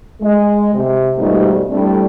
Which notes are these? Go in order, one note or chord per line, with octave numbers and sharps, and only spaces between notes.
G#3
C3
G#2 B2 D#3 F3 G3 A3
G3 A3 C4 D4 E4 A4